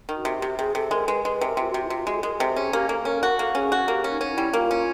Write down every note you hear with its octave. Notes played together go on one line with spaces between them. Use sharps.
D#3
F#4
C3
G4
C3
C3 G#4
C3 A4
G#3 A#4
G#3 B4
G#3 B4
C3
A#4
C3 F4
F#4
C3
E4
C3 F4
G#3 F#4
A4
G#3 A#4
G#4
C3 A4
C#4 G#4
A#3 G4
A#3 A4
C#4 A#4
F#4 A#4
A#3 A4
C#4 G#4
F#4
A#3 G4
C#4
D#4
C#4
E4
G3
A#3 F4
C#4